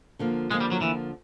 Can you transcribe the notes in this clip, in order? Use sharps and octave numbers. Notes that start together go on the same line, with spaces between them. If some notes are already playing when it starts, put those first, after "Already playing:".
D3 F3 A#3
D3 F3 G#3 A#3
G3
F#3
D3 E3 F3 A#3